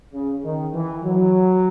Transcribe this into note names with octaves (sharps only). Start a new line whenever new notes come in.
C#3
D#3
E3
F#3